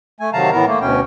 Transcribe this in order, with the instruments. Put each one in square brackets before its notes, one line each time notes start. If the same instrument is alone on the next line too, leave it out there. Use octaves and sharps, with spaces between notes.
[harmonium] A3 G#5
C3 D#3 F#3 F5 A5 A#5
A2 E3 B3 A#4 A#5
A3 A#3
D2 B2 C#4 G5